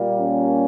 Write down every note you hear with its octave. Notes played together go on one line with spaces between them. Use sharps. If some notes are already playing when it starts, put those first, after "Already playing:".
Already playing: A#2 G3 A#3
C#4